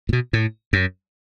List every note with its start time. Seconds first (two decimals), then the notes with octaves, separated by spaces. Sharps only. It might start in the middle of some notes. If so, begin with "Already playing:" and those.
0.09 A2
0.13 B2
0.33 A2
0.73 F#2